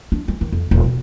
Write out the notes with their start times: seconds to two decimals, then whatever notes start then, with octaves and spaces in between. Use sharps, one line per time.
0.12 D4
0.28 G#3
0.41 D#3
0.52 F2
0.71 D#1
0.84 B2